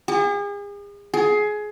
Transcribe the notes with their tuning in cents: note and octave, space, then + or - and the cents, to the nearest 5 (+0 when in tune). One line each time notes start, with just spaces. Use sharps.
G#4 -40
G#4 +20